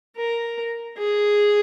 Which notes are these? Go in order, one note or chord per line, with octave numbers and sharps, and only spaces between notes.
A#4
G#4